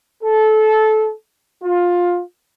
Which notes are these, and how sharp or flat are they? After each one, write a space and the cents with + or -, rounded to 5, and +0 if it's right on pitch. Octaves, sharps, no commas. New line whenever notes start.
A4 -20
F4 +15